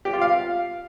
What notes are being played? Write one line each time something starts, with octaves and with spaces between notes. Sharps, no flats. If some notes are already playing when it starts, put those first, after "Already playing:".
G4
F4
F5